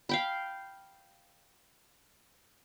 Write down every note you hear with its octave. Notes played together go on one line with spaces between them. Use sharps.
F5 G5 B5